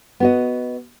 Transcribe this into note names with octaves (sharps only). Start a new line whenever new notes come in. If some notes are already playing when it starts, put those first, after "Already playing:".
B3 F#4 D#5